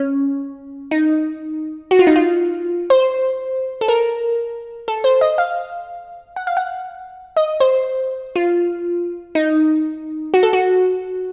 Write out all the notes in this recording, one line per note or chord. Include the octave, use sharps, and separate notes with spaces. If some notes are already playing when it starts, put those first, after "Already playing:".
Already playing: C#4
D#4
F#4
F4
D#4
F4
C5
A4
A#4
A4
C5
D#5
F5
F#5
F5
F#5
D#5
C5
F4
D#4
F#4
A4
F#4